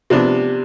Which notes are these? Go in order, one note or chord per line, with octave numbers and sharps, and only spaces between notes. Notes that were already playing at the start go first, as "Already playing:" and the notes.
C3 F3 B3 D4